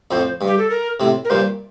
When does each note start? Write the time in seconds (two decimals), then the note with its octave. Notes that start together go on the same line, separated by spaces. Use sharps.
0.11 F2 A2 C5
0.41 G2
0.47 G4
0.58 A4
0.70 A#4
1.00 A2 C3
1.25 A#4
1.30 G2 A#2 C5